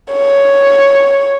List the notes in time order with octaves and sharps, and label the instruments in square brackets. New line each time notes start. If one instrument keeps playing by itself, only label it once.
[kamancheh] C#5